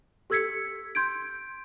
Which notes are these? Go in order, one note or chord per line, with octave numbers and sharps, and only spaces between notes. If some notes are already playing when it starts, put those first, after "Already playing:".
G4 A4 E6 G#6 B6 C#7
C6 G6 G#6 D7